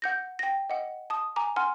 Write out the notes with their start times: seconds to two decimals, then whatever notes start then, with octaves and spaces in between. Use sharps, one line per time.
0.02 F#5 G6 A#6
0.39 G5 A#6
0.70 D#5 F#5
1.10 A5 D#6
1.36 G#5 A#5 D6
1.56 F#5 G#5 C6 F6